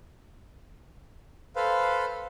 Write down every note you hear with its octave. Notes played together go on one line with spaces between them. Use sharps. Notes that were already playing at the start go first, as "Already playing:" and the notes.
A4 B4 C5 F5